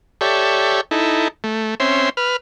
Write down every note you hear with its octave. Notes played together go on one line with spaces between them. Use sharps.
G4 A4 C#5 D5 E5
D#4 E4 A4
A3
C4 C#4 E5 C6
B4 F6